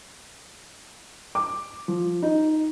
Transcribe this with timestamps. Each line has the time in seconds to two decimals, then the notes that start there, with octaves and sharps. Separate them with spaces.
1.35 D6
1.88 F3
2.22 D#4